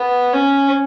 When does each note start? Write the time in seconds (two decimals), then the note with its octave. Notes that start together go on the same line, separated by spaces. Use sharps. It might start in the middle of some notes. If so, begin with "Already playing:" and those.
Already playing: B3
0.33 C#4